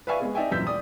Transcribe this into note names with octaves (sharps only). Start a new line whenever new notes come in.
B4 D5 E5 F5 G#5 C#6
G#3 B3 G#4
D#4 D5 E5 G5 G#5
D#1 F#2 E3 E6 G6 B6
D5 D#6